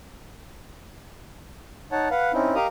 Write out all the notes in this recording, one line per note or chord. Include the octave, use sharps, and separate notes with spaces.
D#4 C#5 F#5 A5
B4 F5 F#5
C4 C#4 D#4 E4
G4 A#4 D#5 F5 A#5 D#6